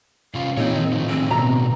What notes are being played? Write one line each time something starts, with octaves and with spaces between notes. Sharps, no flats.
C3 C#4 F4 F5
A#2 E3 C4 D#4 G#4 C#5
D#3 D#4
A2 D3 D#3 F3
C4 G#4
B2 A#5